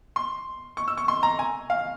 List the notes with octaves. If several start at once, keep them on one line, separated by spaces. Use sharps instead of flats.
C6
C#6
E6
C#6
C6
A#5
G#5
F5